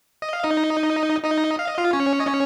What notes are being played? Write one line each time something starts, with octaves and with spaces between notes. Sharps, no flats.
D#5
F5
D#4 D#5
D#4 D#5
F5
D#5
F4 F5
C#4 C#5
D#5
C#4 C#5